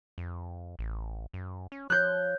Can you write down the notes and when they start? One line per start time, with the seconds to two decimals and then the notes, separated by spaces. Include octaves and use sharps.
0.18 F2
0.79 A1
1.33 F#2
1.72 C#4
1.90 F3 C#5 F#6 G6